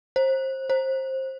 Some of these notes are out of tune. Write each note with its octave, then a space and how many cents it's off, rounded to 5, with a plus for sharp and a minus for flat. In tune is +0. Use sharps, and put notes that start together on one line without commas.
C5 +25
C5 +20